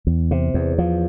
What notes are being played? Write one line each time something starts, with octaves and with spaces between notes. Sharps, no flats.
E2
C3
E2
F3